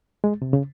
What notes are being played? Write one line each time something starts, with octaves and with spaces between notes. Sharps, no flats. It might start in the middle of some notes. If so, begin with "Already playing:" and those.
G#3
C3
C#3